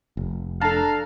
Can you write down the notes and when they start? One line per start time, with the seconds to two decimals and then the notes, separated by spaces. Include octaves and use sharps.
0.17 F1
0.61 D4 A4 F5 A5 A#5